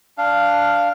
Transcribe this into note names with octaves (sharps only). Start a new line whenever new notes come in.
D4 F5